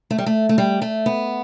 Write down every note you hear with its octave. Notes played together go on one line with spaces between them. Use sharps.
A3
G3
A3
A3
G3
A3
B3